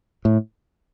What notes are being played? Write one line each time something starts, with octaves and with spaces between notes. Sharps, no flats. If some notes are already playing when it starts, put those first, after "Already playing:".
A2